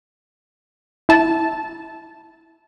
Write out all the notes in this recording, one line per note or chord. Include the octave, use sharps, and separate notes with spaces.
E4 A5